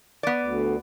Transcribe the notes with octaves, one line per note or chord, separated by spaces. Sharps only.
B3 D5
D2